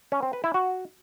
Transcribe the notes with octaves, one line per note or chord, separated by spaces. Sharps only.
C#4
C4
B4
E4
F#4